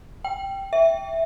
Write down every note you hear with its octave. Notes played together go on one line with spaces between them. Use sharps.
G5
E5